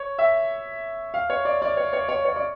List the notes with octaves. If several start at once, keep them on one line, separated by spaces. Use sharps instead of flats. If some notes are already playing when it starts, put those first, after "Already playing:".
Already playing: C#5
E5
F5
C#5
D5
D5
C#5
C#5
C#5
C#5
D5